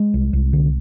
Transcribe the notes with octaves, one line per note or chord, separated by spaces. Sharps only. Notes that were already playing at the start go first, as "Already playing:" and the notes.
Already playing: G#3
C2
C2
D3